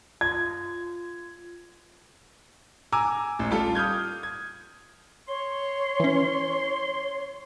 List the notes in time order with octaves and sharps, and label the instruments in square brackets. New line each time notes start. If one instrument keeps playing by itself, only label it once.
[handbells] F4 [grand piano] G#6
[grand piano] G#5 A#5 D6 E6
A1
G3 F4 A4
D#6 F6 G6 G#6
G#6
[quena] C#5 [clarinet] C6
[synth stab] E3 C#4